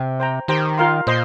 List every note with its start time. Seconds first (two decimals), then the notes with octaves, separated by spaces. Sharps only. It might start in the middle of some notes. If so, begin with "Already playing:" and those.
Already playing: C3
0.20 C5 G5 A#5
0.48 D#3 G4 C5 G5 A#5
0.78 F4 A#4 F5 C6
1.07 A#2 C5 D#5 C6